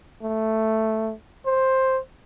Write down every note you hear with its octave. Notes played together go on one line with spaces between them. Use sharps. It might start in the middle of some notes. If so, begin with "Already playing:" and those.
A3
C5